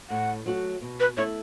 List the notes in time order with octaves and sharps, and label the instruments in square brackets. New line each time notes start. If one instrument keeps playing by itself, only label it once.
[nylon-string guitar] A2 [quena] F#5
[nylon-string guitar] F#3 A3 F#4
B2
[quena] B4
[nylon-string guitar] A3 E4 [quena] C#5